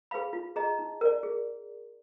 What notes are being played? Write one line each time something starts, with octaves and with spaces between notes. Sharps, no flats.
G#4 B4 F5 B5
F4
G#4 D#5 A#5
D#4
A#4 D5
G#4